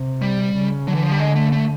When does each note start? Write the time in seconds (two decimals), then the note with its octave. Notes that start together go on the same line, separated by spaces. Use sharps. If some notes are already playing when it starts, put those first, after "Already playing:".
Already playing: C3
0.22 G3
0.54 C#3
0.86 D3 F#3
0.95 E3
1.03 F3
1.11 G3
1.19 G#3
1.36 A3
1.52 A3